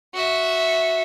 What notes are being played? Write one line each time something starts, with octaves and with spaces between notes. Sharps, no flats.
F#4 E5